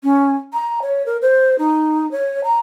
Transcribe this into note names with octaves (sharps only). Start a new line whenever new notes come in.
C#4
A#5
C#5
A#4
C5
D#4
C#5
A#5